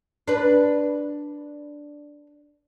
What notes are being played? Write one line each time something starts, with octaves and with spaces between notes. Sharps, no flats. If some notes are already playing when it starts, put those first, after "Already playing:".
D4 B4